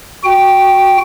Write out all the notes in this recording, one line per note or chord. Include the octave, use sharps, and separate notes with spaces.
F#4 G5